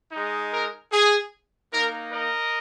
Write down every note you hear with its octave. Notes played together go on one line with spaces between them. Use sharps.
G#3 D#4
A#4
G#4
A#3 D#4 A#4
A#4 D#5